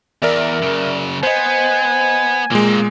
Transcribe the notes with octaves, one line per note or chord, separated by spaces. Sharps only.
E2 A#4 D5 E5
F#2 C#3
B3 C5 D#5 G#5
A#2 G#3 A#3 C4